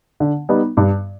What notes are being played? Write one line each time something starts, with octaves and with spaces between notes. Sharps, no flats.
D3
G3 B3 D#4
G2